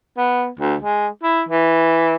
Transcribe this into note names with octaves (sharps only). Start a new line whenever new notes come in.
B3
D2
G#3
E4
E3